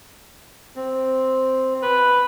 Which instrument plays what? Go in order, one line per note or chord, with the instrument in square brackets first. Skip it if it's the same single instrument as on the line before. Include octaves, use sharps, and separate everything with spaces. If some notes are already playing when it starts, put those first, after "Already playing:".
[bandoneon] C4
[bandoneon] C3 [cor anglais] B4